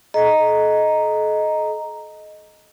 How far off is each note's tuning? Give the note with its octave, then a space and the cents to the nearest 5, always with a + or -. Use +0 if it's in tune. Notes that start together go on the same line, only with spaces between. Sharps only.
A4 -40 D#5 +0 A#5 +0